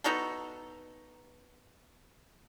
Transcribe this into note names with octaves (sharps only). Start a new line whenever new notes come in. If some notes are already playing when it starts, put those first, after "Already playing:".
B3 D#4 F#4 A4